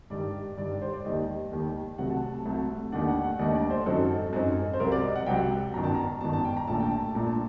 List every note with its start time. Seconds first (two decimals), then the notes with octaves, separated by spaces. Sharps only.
0.10 G2 D#3 G3 D5
0.57 G2 D#3 G3 D5
0.81 C5
0.93 D5
1.05 D#2 D#3 G3 D#5
1.52 D#2 D#3 G3
1.98 C2 C3 F#3 A3 F#5
2.10 A5
2.34 A5
2.45 C2 C3 F#3 A3
2.92 D#2 D#3 A3 D4 F#5
3.08 F#5
3.24 F#5
3.39 D#2 D#3 A3 D4 D#5
3.55 D5
3.70 C5
3.86 F#2 F#3 C4 D#4 A4
4.33 F#2 F#3 C4 D#4
4.74 C5
4.80 C2 C3 F#3 A#4
4.92 D5
5.03 D#5
5.16 F#5
5.26 C2 C3 F#3 G5
5.74 G1 F#2 D#3 A#5
5.84 A5
5.95 A#5
6.21 G1 F#2 D#3 A5
6.33 A5
6.45 G5
6.57 A#5
6.68 A#1 A#2 A3 D4 A5
6.80 G5
6.91 A5
7.15 A#1 A#2 A3 D4 A#5
7.27 A5